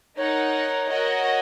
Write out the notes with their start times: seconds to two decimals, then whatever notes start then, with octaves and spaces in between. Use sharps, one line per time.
0.17 D#4 A#4 C#5 F#5
0.89 F#4 A#4 D#5 F#5